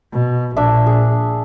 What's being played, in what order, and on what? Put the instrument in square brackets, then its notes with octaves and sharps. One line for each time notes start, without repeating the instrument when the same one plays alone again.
[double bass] B2
[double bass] A#1 [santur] D4 E5
[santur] G#4